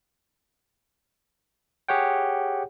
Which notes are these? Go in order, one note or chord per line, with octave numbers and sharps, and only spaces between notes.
G4 G#4 C#5 F#5 G5